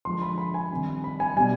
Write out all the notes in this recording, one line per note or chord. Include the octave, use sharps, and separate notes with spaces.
D3 F3 G#3 C6
B5
B5
G#5
C3 D#3 G3
B5
G#5
B2 G3 G#5